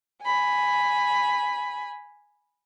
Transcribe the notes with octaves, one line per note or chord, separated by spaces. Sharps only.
G#5 B5